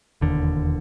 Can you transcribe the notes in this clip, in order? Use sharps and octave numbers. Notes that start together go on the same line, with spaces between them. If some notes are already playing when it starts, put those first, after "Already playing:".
E1 D#2 D3